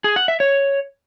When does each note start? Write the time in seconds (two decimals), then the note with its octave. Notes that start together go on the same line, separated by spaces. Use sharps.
0.04 G#4
0.16 F#5
0.28 E5
0.40 C#5